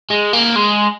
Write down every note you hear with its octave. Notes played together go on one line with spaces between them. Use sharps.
G#3
A#3
G#3